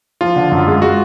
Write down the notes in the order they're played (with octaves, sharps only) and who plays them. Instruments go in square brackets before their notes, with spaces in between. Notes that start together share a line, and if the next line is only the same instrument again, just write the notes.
[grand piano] F3 [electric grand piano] F4
[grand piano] D3
F#2
G#3
[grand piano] G#3 [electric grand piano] F#4